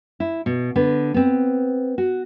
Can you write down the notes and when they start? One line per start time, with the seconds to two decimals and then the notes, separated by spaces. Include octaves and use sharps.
0.20 E4
0.46 B2
0.76 D3 B3 B4
1.14 B3 C4
1.98 F#4